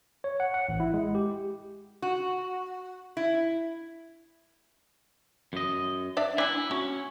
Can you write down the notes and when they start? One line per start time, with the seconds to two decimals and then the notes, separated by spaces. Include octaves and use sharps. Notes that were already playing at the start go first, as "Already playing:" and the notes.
0.24 C#5
0.40 F#5
0.54 F#5
0.69 A1
0.80 E4
0.94 G#3
1.15 G4
2.02 F#4
3.17 E4
5.53 F#2 D#5
6.17 D4 D5 E5
6.38 D4 E4 G#5
6.71 C#4 F#4